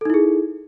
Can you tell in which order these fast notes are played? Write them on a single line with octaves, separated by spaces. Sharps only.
A4 D#4 E4 G#4